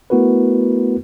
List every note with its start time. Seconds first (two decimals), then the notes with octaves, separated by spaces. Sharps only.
0.10 A3 B3 E4 F#4 A#4 B4